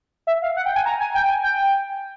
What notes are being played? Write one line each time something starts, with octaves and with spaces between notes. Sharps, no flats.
E5
F5
F#5
G5
G#5
A#5
G#5
G5
G#5
G5